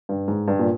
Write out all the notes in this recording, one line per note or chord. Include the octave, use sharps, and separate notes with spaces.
G2
G#2
G2
A#2